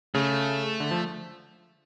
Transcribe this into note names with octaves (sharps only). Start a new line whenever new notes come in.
C#3 A3
D3
F3